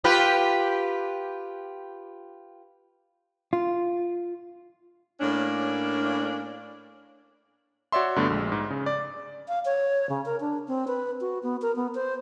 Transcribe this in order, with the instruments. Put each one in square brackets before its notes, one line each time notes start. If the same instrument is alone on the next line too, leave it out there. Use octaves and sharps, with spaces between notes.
[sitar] F4 G4 B4
[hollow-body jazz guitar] F4
[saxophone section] A2 A#3 C#4 D4
[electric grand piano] F#4 C#5 D5 E5 C6
G2 D3 A3 B3
A#1 G#3
G#2
C#3
D5
[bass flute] F5
C#5
C#3
A#4
D4
C4
B4
F#4
B3
A#4
B3
C5